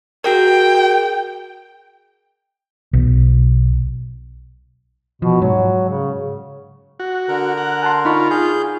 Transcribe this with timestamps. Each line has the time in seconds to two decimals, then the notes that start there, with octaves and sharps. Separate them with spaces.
0.24 F#4 G#4 A#4 G5
2.93 B1
5.22 B2 F3
5.42 G#2 F#3
5.89 C#3
7.00 F#4
7.29 D3 A#4
7.58 F#5
7.82 G#5 A5 C6
8.05 D#4 F4 B5 C#6
8.31 G#4 G6